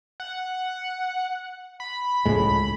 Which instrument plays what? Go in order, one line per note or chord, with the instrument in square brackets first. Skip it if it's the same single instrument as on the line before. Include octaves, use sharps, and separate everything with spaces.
[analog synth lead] F#5
B5
[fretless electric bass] C#2 A2 G#3